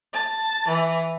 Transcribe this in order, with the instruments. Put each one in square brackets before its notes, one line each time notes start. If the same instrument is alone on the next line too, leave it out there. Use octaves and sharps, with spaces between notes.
[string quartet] A5
E3